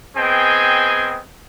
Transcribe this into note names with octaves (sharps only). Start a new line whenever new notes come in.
B3 C4 G#4 D#5 G5 G#5